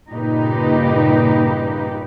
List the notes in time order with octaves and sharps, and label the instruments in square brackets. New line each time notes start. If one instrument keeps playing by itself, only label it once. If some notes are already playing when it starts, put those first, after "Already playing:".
[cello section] G2 A#2 C#3 D#4 G4 B4